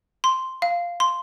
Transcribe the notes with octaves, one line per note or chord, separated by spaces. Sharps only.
C6
F5
C6